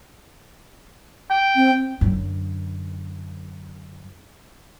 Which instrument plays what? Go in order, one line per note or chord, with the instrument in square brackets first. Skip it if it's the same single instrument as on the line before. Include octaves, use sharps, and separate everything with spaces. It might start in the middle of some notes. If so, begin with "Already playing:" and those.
[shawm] G5
[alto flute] C4
[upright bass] F#2 D3